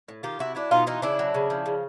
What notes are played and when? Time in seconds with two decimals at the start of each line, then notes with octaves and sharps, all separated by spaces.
0.08 A2
0.23 D#3 F4 G4
0.39 C3 E4 F#4
0.55 F#3 D4 E4
0.71 B2 D#4 F4
0.87 E3 D#4 F4
1.02 C#3 D4 E4
1.19 F#3
1.34 C#3
1.50 F3
1.66 C#3